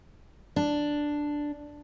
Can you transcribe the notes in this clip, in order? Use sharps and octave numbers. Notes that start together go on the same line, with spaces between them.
D4